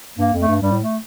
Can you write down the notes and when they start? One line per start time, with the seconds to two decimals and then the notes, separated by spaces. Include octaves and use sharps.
0.18 G2 A#3
0.33 F2
0.40 A3
0.48 G2
0.61 G2 G3
0.72 A2
0.82 A3